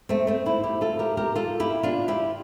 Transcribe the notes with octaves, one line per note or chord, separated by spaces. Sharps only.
A3 C4
A3 C4
C4 E4
E4 G4
F4 A4
G4 A#4
G4 A#4
F4 A4
E4 G4
D4 F4
E4 G4